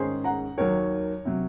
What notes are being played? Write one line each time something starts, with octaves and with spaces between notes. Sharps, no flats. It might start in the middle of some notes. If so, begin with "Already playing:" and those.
Already playing: G#2 D#3 G#3 C#4 G#4 C5
F#5 A#5
D#2 D#3 F#3 A#3 A#4 C#5
C3 F#3